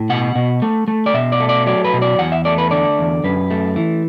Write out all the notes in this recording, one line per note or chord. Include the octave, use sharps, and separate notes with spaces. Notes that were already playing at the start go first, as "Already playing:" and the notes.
Already playing: A2
B2 F#5
B2
A3
A3
D5
B2 E5
D5
A3
D5
F#3 D5
B4
B2
D5
E2 F#5
E5
A3 D5
B4
D3 D5
E2
F#2 B4
A3
E3